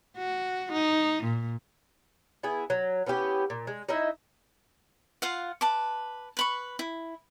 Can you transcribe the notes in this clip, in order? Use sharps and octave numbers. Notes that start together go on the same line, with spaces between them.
F#4
D#4
A#2
B3 E4 G#4
F#3
B3 C#4 E4 G4
A#2
G#3
D#4 E4 D#5 E5
F4 F5 F#5
B4 A5 D6
B4 B5 C#6
E4